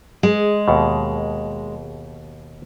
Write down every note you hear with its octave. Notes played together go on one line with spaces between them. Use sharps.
G#3
D#2 B2